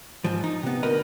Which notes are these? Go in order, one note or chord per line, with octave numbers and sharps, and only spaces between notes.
G#2 F3
D#4
C3 B3
D2 A#4 B4 D#5